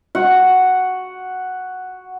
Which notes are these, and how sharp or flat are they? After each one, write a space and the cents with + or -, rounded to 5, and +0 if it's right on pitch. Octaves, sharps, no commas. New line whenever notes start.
F#4 +0 F#5 +0